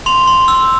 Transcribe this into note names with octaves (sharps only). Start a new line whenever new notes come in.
C6 F7
C6
E6